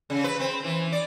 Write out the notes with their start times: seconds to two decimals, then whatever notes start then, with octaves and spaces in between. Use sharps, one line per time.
0.10 C#3
0.24 B4
0.40 C4
0.64 E3
0.92 D5